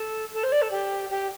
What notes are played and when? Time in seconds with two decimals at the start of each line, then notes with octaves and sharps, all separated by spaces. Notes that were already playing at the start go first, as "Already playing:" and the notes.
Already playing: A4
0.34 A4
0.43 C5
0.52 D5
0.62 A4
0.71 G4
1.10 G4